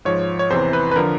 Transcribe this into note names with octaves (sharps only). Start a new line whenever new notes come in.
G#2 F3 C#5
C#5
E2 C3 E3 C5
B4
B4
D3 F3 A#4